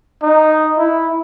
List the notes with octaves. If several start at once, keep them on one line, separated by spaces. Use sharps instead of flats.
D#4
E4